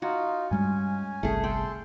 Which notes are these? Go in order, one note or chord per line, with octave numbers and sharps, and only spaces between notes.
D#4 F4 F#4
G2 G3 G#3 C#4 G#5
G1 C2 A3 G#4
A4 G5 C6